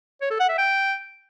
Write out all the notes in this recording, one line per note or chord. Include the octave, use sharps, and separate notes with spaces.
C#5
A4
F#5
E5
G5